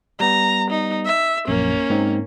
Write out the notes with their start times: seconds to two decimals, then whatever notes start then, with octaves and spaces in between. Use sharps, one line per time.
0.20 G3 B3 A#5
0.71 D#4
1.06 E5
1.48 A#1 F#2 A#3 C#4
1.90 G#2 C4 D#4